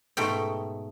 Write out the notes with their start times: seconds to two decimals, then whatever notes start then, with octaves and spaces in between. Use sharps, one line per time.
0.17 G#2 B2 A3 G5